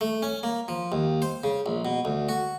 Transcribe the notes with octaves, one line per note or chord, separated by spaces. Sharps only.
A3
C#4
A#3
F3
D#2
C5
C#3
A#1
B2
D2
F#4